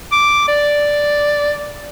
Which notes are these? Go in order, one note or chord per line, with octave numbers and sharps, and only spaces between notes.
D6
D5